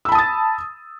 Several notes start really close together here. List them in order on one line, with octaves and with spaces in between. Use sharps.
E6 B5 A5 D#6 A6